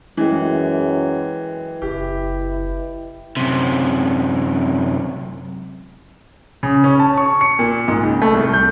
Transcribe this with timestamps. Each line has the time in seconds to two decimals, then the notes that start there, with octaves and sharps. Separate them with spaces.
0.17 F#2 E3 G#3 B4 D#5 G5
1.82 F#1 E4 G4
3.37 F#2 C3
6.63 C#3
6.84 C#4
6.99 A5
7.17 C#6
7.41 C#7
7.59 A#2
7.88 G#2
8.03 C#2
8.22 A3
8.34 C2
8.54 G6